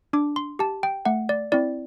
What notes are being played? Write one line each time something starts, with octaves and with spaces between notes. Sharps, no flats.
D4 D6
C6
G4 A5
G5
A3 F#5
D5
C4 E4 D5